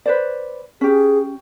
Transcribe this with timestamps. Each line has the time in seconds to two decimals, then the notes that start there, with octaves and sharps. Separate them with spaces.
0.06 B4 C5 D5
0.81 C#4 G4 G#4